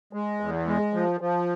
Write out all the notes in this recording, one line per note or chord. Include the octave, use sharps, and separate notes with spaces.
G#3
E2
G#3
F3
F3